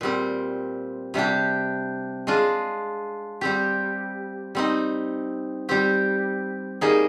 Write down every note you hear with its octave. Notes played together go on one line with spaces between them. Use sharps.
A#2 G3 C4
C3 G3 D4 G4
G#3 D4 F4
G3 C4 G4
G3 C4 D#4
G3 C4 G4
G3 A#3 D#4 G#4